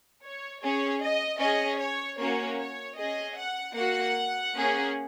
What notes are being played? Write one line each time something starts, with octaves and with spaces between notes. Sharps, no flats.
C#5
C#4 G#4 C#5
D#5
C#4 G#4 D#5
C#5
A#3 C#4 F#4 C#5
C#5
C#4 G#4 D#5
F#5
A#3 F#4 F#5
A#3 C#4 G#4